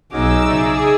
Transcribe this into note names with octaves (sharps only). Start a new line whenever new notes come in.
B1 C#4 D#4 F#4 G#4 D6 E6
C#3 G#4 D5 E5 E6